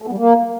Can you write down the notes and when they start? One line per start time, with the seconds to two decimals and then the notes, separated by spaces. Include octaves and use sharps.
0.02 A3
0.07 B3
0.12 G3
0.18 A#3